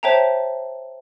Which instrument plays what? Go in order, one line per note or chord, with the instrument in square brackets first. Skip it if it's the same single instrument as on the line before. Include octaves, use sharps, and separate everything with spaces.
[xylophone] C5 C#5 E5 G5 A5 A#5